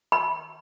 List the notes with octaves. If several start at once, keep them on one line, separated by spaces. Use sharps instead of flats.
B5